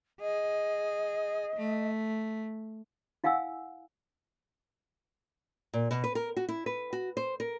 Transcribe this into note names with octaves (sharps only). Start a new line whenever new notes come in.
G#4 D#5
A3
E4 F5 F#5 G#5 E6
A#2
B2
B4
A#4
F#4
E4
B4
F#4
C5
A#4